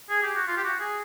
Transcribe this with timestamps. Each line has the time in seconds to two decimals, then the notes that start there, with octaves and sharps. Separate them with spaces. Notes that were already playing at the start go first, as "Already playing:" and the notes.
0.10 G#4
0.23 G4
0.36 F#4
0.48 F4
0.57 G4
0.64 F#4
0.80 G#4